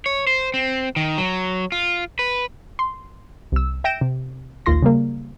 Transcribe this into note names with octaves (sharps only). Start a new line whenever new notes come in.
C#5
C5
C4
D#3
F#3
F4
B4
C6
C2 E6
E5 G5 G6 A#6 D7 E7
C3
A#1 D#2 F4 C6 A#6
C#3 G3 A#3